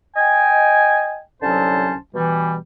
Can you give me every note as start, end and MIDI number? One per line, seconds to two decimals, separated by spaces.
0.16 1.21 75
0.16 1.21 79
0.16 1.21 80
1.42 1.96 36
1.42 1.96 50
1.42 1.96 54
1.42 1.96 61
1.42 1.96 72
1.42 1.96 81
2.15 2.57 47
2.15 2.57 52
2.15 2.57 55